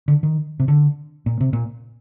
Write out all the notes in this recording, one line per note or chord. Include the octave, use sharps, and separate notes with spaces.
D3
D#3
C3
D3
A#2
C3
A#2